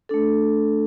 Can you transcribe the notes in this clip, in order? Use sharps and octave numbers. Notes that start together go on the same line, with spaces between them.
A3 D4 A4